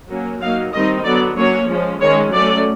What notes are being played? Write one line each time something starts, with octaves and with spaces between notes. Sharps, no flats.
F#3 A#3 C#4
F#3 A#3 D#4 F5
D#3 G3 C4 D#4 D#5
D3 F#3 B3 D5
F#3 A#3 C#4 C#5
F3 G#3 C#4
D#3 G#3 C#4 C#5
F#3 A3 C#4 D5